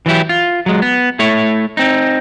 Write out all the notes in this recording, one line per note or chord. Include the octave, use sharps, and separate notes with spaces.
E3 F#3 E4 G4
F4
F#3 G#3
B3
A3 E4 C#5
C4 D#4